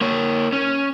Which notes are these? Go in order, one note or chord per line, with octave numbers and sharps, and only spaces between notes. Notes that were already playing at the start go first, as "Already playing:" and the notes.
A#3 C#5
C#4